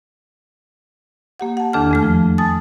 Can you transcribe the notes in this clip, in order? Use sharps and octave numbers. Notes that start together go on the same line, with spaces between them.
A#3 G4 F#5
F#5 A5
E2 D#3 D4 A4 A5 F6
F2 A3 F6
F3
G#5 A5 D#6 A6